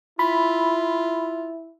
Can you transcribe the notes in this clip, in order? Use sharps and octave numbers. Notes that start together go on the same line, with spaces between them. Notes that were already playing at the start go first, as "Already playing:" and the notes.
E4 F4 B5